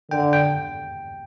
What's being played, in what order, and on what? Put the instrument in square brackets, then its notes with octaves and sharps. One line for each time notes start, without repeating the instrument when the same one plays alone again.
[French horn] D3 [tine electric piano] G5
[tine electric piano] G5